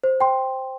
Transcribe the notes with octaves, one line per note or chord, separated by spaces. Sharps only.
C5
G5 C6